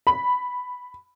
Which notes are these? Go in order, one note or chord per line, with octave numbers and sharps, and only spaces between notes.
B5